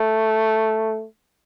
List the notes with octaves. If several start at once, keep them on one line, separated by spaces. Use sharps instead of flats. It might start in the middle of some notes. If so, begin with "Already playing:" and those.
Already playing: A3